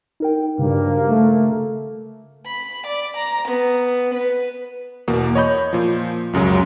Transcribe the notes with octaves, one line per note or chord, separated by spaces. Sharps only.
D#4 A#4 G5
G#1 G2 C#3 A#3
A3
B5
D5
A#5
B3
B4
E2 B2 A#3
C#5 D#5 B5 G6
A#2 F3
C#2 F#2 C#3 F#3